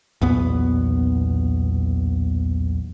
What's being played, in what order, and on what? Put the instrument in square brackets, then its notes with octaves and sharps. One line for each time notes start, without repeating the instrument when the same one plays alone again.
[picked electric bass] B1 E2 A#2 B3